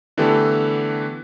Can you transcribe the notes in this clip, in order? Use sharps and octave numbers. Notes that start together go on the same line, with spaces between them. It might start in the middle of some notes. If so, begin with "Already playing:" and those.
D3 E3 A3 B3 G4 A4